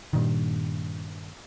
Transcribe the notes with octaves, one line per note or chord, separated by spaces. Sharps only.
G2 A#2 D#3